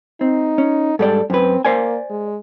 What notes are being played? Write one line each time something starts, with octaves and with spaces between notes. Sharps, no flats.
C4 D#4
C#4
G#2 G3 A4 D5
F#2 C4 B4
A#3 C5 D5 G#5
G#3